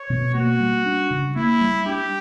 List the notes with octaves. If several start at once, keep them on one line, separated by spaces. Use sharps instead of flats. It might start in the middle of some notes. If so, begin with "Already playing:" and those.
Already playing: C#5
B2
A#3 F#4
G3
D4
C#3
A#3 E4
G3
D4 G4